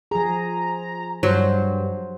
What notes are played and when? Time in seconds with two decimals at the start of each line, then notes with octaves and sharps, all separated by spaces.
0.11 F3 G#4 A#5
1.23 G2 F#3 C5